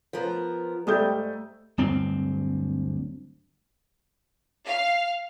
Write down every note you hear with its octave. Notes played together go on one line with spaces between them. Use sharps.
F3 B3 A#4
G#2 G3 A3 D#6 G6
D1 G2 C4
F5